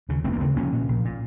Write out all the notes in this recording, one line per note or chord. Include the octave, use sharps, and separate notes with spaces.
D#2 C#3
F1 A3 C4
A#3
D#2 C#3 A3 C4
A#1 A#3 C#4
A#2
A#1
A#2